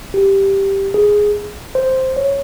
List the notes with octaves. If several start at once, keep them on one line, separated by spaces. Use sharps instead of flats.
G4
G#4
C5
C#5